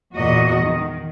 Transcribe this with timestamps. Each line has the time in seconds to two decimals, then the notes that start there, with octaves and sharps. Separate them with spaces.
0.16 E2 A#2 F#4 D#5
0.60 D#3